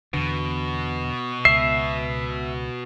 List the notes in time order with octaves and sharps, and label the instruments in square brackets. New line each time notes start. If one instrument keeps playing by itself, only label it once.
[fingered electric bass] E2 D3 [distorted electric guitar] B2
[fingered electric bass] C#2 [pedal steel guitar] E5 [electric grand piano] C7